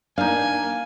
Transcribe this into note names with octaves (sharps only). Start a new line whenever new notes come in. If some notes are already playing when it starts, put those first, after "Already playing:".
A#3 D4 D#4 F5 G#5